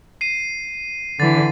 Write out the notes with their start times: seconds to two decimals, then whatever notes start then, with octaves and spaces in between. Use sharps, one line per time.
0.21 C7 D#7
1.20 D3 E3 A6